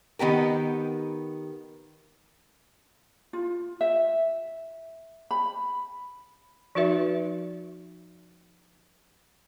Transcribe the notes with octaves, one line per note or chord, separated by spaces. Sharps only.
D#3 B3 G4 A#4
F4
E5
B5
F3 D#4 F#4 B4 E5